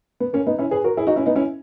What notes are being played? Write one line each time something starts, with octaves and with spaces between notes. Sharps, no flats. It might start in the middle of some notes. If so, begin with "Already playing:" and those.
B3
A#3 C#4
B3 D#4
C#4 E4
G#4 B4
F#4 A#4
E4 G#4
D#4 F#4
C#4 E4
B3 D#4
C#4 E4